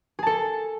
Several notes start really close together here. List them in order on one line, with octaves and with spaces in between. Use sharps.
G#4 A5 A4